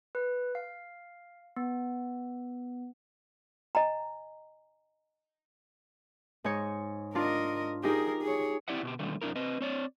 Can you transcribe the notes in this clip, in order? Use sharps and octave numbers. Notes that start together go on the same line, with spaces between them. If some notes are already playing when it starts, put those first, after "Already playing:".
B4
F5
B3
D#5 G#5 A#5
G#2 D#4 C#5
D4 F4 A#4 D#5
D#4 G4 G#4 A#4
G#4 C#5
C4 E4 G4 D5 E5 F#5
B2 F#4 G4
B2 D3 D#3 G3 A3
F#2 C3 E3 D4 E4 A#4
C4 B4 D#5
C4 C#5 D5